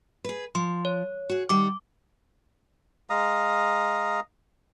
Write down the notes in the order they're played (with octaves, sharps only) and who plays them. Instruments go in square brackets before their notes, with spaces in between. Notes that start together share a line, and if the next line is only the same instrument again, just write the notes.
[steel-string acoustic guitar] G#4 B4
[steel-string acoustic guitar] F3 [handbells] C6
[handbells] C#5
[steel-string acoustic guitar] F#4 G#4
[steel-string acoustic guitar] D#3 G3 F#5 [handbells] D6
[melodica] G#3 F5 A#5 D#6